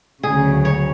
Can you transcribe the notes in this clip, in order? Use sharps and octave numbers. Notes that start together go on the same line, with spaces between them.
D2 C#3 F#3 G#4
C#5